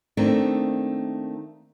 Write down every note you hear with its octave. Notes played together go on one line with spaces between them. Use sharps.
D#3 A3 A#3 C4 D4